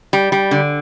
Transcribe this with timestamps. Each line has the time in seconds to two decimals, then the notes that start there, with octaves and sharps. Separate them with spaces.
0.13 G3
0.32 G3
0.51 D3